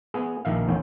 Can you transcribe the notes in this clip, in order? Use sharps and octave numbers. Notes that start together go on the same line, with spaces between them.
B3 G#4
A#1 D#3 E5 F5
A1 E2 C#4 G5